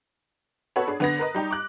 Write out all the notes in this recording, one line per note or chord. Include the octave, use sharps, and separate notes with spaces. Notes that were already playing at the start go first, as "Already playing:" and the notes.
B3 F#4 A4 C#5 B5
D4 G#4
D3 B3 A#6
A#4 B4 D#5
G3 D#4 G4
D6 F#6